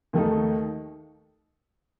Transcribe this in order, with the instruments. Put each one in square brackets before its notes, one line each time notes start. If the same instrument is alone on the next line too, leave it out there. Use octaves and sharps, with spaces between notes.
[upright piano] D#2 D#3 A3 D#4